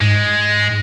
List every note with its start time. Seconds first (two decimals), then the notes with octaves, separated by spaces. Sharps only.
0.01 G#2 G#3